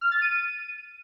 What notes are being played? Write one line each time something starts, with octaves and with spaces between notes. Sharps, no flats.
F6
A6
D#7